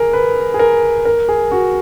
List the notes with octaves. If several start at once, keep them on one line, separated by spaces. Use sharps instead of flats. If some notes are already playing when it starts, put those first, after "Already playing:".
Already playing: G#4 A#4
B4
G#4
A#4
A#4
G#4
F#4